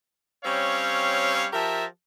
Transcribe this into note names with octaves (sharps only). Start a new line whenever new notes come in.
G3 C4 C#4 C#5 F5
F3 G4 A#4 E5 A5